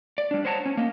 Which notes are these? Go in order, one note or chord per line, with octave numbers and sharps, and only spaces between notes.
D5
G3 D4
C5 C#5 D#5 F#5 A5 A#5
C#4
A#3 D#5